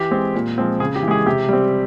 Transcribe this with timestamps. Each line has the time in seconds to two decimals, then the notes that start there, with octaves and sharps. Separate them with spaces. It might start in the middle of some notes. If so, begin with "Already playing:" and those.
Already playing: E3 G4
0.11 G#3 C4
0.34 A#2
0.58 F3 G#3 C4
0.80 C#3 G#4
0.95 G4
1.03 E3
1.08 G#3 G#4
1.26 C3 G4
1.49 G3 C4